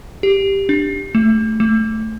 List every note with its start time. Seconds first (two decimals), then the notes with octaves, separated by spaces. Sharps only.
0.23 G4
0.69 D4
1.15 A3
1.60 A3